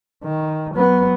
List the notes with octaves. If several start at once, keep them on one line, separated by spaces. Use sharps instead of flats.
D#3
F#3 B3